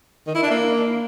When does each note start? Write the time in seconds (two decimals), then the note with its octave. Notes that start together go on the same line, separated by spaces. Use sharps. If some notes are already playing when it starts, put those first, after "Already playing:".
0.27 D#3
0.35 E4
0.43 D4
0.51 A#3